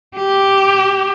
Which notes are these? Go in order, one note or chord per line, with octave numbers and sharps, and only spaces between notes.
G4